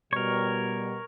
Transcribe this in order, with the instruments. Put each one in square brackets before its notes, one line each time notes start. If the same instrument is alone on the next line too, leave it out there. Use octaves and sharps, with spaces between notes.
[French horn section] B2 G3 [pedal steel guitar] A#4 C#5